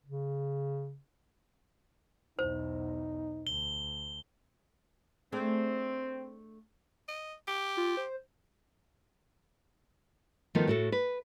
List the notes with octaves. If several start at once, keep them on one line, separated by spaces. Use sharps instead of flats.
C#3
B1 E2 D#4 C5
D2 G7
A3 C4 D4 G#4
D#5
G4
F4
C5
D#3 F3 A3 B3 F4
A2 F#4 A4
B4